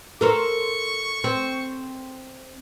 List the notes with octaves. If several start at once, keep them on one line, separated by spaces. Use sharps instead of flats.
A4 A#4 C5 C#6
C4